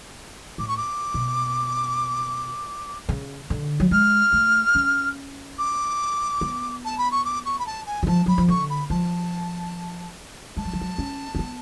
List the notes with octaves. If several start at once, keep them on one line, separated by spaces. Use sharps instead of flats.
A2 D6
C#6
D6
B2
C#3
D3
F#3
G#3 F6
A3
C#4
D6
B3
A5
B5
C#6
D6
C#6
B5
A5
G#5
F#3
F3 A5
F#3 B5
F3
D3 C#6
B5
F3 A5
G#3 A5
F#3
F3
F#3
C#4
C#4
B3